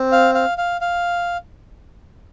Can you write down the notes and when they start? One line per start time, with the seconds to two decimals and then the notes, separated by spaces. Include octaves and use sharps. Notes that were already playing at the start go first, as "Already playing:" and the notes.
Already playing: C4
0.12 F5
0.35 F5
0.58 F5
0.81 F5